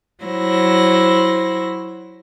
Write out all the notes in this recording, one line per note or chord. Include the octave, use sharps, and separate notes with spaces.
F#3 E4 C5 A#6